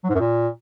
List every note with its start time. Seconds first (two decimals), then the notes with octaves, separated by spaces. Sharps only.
0.04 F#3
0.09 G#2
0.15 F#2
0.20 A#2